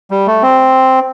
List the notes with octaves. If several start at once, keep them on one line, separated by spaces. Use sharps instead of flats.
G3
A3
C4